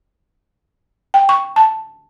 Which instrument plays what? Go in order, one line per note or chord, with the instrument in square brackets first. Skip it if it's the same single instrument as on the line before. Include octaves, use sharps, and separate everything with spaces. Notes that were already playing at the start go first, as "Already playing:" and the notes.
[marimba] G5
C#6
A5